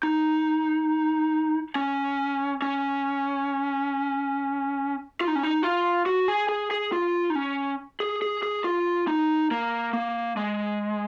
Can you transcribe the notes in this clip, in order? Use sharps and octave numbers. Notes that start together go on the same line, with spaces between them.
D#4
C#4
C#4
F4
D#4
C#4
D#4
F4
F#4
G#4
G#4
G#4
F4
D#4
C#4
G#4
G#4
G#4
F4
D#4
A#3
A#3
G#3